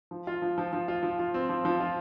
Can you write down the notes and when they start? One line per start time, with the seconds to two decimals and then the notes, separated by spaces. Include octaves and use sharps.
0.11 F3
0.27 F4
0.42 F3
0.58 F3
0.73 F3
0.88 F4
1.03 F3
1.19 F4
1.34 C4
1.49 F3
1.65 F3
1.80 F4